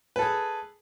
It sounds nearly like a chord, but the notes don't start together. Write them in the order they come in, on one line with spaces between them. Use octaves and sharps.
B4 A4 G#4